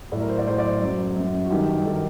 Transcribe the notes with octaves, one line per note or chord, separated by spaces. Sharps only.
A2 F#3 D5
A#4
C5
D5
A2 F#3 C5
D5
F#2 F#3
F#2 F#3
F#4
G2 D#3 F#3 G4
D#3 F#3 A4
A#4